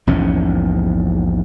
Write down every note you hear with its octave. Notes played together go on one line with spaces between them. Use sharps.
A#1 E2 G#2 C#4